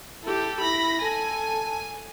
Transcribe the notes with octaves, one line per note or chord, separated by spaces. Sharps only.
E4 G4 A4
E4 B5 A#6
A4 G#5